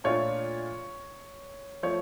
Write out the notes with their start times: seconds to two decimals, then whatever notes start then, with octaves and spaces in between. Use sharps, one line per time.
0.04 A#2 A3 D4 F4 C#5
1.83 F3 A3 C#5